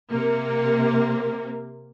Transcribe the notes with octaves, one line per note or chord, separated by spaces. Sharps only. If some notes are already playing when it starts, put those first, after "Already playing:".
C3 A#3